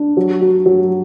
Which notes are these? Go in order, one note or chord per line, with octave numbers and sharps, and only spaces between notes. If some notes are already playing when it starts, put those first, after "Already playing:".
Already playing: D4
F#3
F#4
F#3